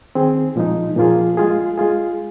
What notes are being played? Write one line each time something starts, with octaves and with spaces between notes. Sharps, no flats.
D#3 C4 G#4
A#2 F3 G#3 D#4
A#2 F3 A#3 F4 G#4
G#3 F4 G#4
G#3 F4 G#4